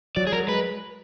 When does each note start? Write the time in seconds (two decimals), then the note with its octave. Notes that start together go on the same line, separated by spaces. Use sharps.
0.16 F#3 D5
0.27 G#4
0.32 F#3 A#4
0.47 G#3 B4